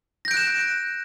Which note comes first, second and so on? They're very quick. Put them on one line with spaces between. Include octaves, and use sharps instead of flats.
A#6 G6 D7 F#6 E7